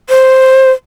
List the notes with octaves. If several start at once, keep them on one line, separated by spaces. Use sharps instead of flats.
C5